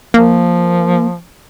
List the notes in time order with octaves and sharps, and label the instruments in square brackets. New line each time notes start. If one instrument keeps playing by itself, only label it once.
[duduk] F3 [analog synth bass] A#3